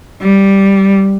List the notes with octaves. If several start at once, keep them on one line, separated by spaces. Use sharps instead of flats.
G3